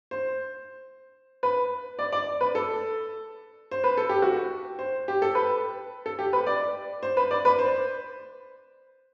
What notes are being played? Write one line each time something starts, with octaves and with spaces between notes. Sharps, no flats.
C5
B4
D5
D5
B4
A4
C5
B4
A4
G4
F#4
C5
G4
A4
B4
A4
G4
B4
D5
C5
B4
D5
B4
C5